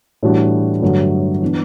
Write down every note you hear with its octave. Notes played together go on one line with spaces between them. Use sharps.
A2 E3 G3 D4 F#4
G2 D3 F#3 A3
E3 B3 D4